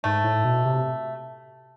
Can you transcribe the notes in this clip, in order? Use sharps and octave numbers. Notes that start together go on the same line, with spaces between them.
G#2 A3
A2
B2
C3